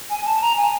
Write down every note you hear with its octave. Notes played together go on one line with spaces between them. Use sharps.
G#5
A5
A#5
G#5